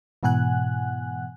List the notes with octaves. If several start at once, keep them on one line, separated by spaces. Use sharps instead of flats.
G#2 B2 E3 F#5 G#5 F#6